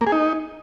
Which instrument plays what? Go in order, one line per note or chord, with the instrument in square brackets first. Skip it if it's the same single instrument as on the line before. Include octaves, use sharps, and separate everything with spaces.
[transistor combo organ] A#3
G#4
D#4